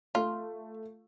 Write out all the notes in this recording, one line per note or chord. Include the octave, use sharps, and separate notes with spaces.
A3 F4